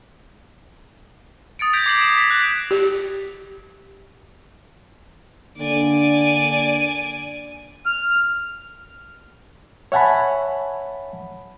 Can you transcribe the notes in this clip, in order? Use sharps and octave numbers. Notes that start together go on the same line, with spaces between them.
D#6 A6 C#7 D7
G6 G#6 A#6 B6 D7 F7
D6 G#6 C7 F7 F#7
G#6 E7 F7
A#6 B6
F#6 F7
G4
D3 A#3 D4 D5 G#5
F6
C#5 E5 F#5 G#5 A5 B5